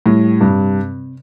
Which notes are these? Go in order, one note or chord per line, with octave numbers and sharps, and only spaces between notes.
A2 G3
G2 C3